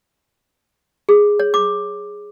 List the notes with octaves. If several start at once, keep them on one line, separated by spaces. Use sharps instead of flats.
G#4
C#5
D6